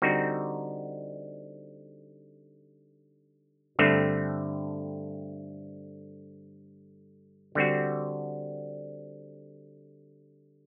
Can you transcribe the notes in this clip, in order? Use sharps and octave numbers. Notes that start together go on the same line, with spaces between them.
D3 G3 C4 D#4 F#4
G2 D3 A3 C4
D3 G3 C4 F#4